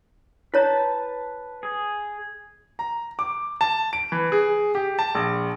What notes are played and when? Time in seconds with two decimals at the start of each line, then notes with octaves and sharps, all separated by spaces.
0.54 E4 B4 C#5 A5 A#5
1.63 G#4
2.79 A#5
3.19 D6
3.61 A5
3.93 D7
4.12 E3
4.32 G#4
4.75 G4
4.99 A5
5.15 A#1